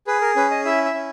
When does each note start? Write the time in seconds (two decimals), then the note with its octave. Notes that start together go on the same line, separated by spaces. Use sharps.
0.07 G#4 B4
0.21 A#4
0.36 C#4 B4
0.51 D#5
0.65 E4 E5
0.85 E5
0.94 C#4